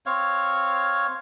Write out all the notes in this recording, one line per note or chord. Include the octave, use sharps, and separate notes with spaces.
C4 C#5 F5